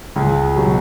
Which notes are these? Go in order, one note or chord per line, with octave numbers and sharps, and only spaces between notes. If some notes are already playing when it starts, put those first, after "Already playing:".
C#2
B2 F#3